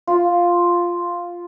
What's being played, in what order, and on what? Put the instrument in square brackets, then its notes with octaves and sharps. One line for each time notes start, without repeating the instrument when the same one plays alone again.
[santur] F4